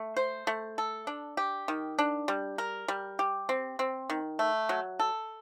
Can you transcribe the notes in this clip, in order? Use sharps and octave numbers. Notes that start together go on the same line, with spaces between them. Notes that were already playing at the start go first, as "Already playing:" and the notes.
Already playing: A3
C5
A3
A4
D4
G4
D#3
D4
G3
A#4
G3
G4
C4
C4
D#3
A3
F#3
A4